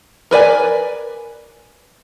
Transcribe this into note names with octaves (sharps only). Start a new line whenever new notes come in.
A#4 B4 D5 G#5